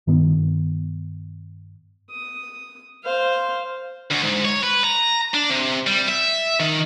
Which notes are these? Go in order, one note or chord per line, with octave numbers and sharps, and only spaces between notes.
G2 D#3 B3
D#6
C5 F5
D2
G#2
C#5
B4
A#5
D4
C3
G3
E5
D#3